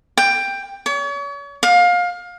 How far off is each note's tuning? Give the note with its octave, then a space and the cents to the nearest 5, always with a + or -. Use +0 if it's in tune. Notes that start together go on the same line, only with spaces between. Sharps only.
G5 +10
C#5 +40
F5 +25